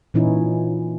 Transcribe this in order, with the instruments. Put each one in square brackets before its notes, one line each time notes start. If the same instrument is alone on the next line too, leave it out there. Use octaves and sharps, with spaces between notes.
[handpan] A#2 E3 C#4 D#4 E4